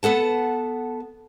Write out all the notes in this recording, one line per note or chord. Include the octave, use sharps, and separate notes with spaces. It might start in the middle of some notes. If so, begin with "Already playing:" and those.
B3 A4 F#5 A5